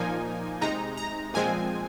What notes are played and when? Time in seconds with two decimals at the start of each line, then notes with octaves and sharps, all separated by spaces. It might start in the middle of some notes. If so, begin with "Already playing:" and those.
Already playing: A#2 F3 A#3 D#4 G#5
0.61 C3 G#3 D#4 A#5
0.97 A#5
1.34 A#2 F3 G#3 C4 G#5